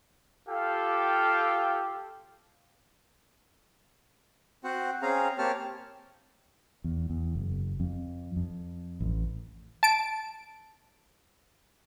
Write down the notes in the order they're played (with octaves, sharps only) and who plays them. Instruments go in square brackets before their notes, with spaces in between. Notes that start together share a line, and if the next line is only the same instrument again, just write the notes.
[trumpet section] F4 G4 A4 F5 G5
[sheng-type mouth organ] C4 F#4 C5 F#5
C4 C#4 G#4 F5 A#5
A#3 C4 G4 C#5 A5 F6
[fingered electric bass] E2
E2
F#1
F2
F2
A1
[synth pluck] A5 D7